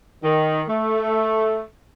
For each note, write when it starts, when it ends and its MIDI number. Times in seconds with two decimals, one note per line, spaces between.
0.23 0.63 51
0.69 1.65 57